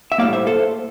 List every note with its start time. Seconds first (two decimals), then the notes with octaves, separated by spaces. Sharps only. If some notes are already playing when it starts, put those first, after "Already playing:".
0.12 E5
0.18 A2 G3 A#3 D5 F5
0.33 C5 E5
0.47 A4 C5